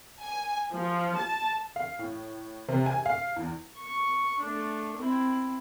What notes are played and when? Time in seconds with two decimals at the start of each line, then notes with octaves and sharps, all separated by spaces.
0.23 G#5
0.72 F3
1.16 A5
1.76 F5
1.99 A2
2.68 C3
2.86 G#5
3.06 F5
3.36 E2
3.78 C#6
4.40 A3 D4
4.97 C4 E4